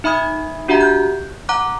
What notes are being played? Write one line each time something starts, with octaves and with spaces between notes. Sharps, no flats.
D#4 E5 B5 D#6 G#6
D4 F#4 G4 E5 F#5 A#5
F#6 G6
F#5 A#5 D6 F#6